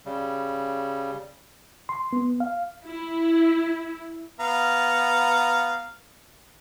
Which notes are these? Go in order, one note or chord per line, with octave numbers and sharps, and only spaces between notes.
C#3 G3
C6
B3
F5
E4
B3 F5 A#5